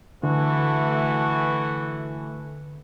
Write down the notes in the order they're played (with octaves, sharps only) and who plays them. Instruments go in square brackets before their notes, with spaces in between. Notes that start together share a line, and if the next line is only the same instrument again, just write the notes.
[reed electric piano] D3 [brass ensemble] E3 A3 [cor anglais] F#4